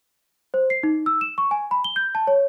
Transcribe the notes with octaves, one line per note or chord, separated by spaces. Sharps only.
C5
C7
D#4
E6
E7
C#6
G#5
B5
G7
G6
A5
C#5